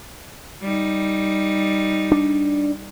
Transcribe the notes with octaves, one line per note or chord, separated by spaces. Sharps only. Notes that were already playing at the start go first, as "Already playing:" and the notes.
G3 D#4
D4